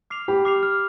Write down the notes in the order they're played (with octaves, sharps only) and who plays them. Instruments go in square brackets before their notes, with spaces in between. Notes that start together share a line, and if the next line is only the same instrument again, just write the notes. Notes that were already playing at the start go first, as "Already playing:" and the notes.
[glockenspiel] D6 F6 C7 F7
[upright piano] G4 [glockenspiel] B5
[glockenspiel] D6 F6 C7 F7
F6